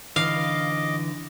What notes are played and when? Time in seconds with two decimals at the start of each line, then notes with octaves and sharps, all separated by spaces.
0.16 D3 E3 D#5 F5 D6